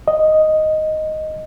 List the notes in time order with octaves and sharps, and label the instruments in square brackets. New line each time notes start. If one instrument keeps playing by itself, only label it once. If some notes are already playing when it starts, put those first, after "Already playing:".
[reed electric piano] D#5